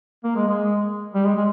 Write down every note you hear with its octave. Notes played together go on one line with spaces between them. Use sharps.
A#3
G#3
G#3
G3
G#3
G#3